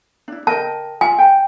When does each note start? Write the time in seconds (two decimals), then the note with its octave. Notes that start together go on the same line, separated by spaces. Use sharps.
0.28 D4 E4
0.47 A#4 D#5 G5 A5
1.01 F4 E5 G#5 A5
1.18 G5 A5